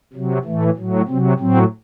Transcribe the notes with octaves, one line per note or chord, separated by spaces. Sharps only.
C3 F#3
A2 E3 A3
A2 F#3
C3 F#3 C4
A2 F#3 C4